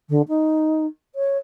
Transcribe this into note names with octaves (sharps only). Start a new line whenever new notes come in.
D3
D#4
C#5